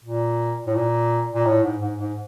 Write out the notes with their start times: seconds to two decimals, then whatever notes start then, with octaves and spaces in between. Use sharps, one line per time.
0.04 A#2
0.67 A2
0.75 A#2
1.34 A#2
1.46 A2
1.63 G#2
1.81 G#2
1.99 G#2